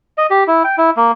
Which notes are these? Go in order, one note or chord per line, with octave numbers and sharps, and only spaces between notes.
D#5
G4
E4
G5
E4
A#3